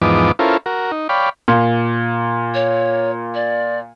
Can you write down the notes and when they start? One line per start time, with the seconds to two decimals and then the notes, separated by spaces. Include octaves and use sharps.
0.02 E2 G#2 F3 B3 D#4 D6
0.39 C#4 E4 F4 A4 A#4 C5
0.66 F#4 A#4
0.92 D#4
1.09 C#5 D5 F5 G5 B5
1.48 A#2
2.54 C#5
3.35 D5